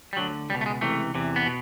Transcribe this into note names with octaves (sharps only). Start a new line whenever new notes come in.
G3
D2 D3 F#3
C#2 B2 G3
A3
G#3
C#2 C3 E3 A3
E2 C3 E3
B3
B2